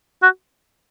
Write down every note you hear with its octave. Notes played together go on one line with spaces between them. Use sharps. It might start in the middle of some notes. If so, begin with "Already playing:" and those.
F#4